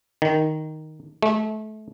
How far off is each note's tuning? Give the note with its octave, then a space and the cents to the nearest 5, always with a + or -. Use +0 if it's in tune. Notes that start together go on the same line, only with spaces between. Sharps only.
D#3 +0
A3 -30